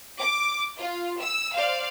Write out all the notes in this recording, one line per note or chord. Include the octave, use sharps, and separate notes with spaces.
D6
F4
E6
C5 D5 F5